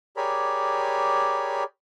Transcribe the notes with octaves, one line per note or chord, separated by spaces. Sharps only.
G4 G#4 A#4 C#5 D5 B5